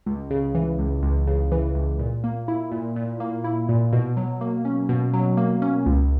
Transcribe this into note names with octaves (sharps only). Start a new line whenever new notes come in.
C#2
C#3
E3
C#2
C#2
C#3
E3
C#2
A#2
A#3
E4
A#2
A#2
A#3
E4
A#2
B2
F#3
A#3
C#4
B2
F#3
A#3
C#4
C#2